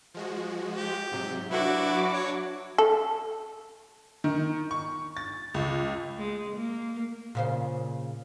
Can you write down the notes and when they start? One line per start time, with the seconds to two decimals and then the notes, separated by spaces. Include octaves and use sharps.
0.14 F3 G#3 F#4
0.75 G4
1.12 G#2 C3 F#3
1.51 F#3 D4 E4 F#4 B4 D6
2.12 C#5
2.78 A4
4.24 D#3
4.71 C#6
5.17 A6
5.54 C#2
6.18 G#3
6.56 A#3
7.35 A#2 C#3 C5